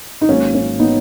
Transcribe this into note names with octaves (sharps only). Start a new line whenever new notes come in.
D#4
G#1 G#2 F#3 A#3 C#4
C#4
B3 D#4